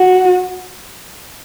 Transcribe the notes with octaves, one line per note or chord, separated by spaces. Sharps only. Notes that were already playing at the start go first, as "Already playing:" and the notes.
Already playing: F#4